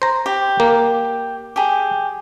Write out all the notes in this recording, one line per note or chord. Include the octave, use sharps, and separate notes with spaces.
C5 A#5
G4
A#3
G4 G#4